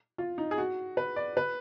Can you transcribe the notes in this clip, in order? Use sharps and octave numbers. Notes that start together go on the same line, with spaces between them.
F4
D#4
G#4
F#4
B4
D5
B4